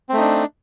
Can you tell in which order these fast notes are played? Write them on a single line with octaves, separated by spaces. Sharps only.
C4 A3 D#4 D4